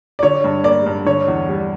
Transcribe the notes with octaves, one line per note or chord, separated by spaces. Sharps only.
D5
D3 C#5
G2
A#3 D5
G2
D3 C#5
E2
G3